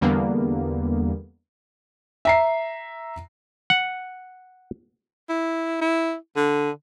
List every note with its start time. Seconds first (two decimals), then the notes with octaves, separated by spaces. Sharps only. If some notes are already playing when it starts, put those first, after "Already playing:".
0.01 E2 D3 G3 A#3 B3
2.25 E5 A#5 C7
3.70 F#5
5.29 E4
5.81 E4
6.36 D3